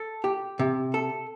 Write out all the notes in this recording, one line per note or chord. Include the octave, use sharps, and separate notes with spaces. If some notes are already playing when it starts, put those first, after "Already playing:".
Already playing: A4
G4
C3
A4